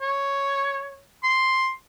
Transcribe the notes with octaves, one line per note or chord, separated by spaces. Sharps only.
C#5
C6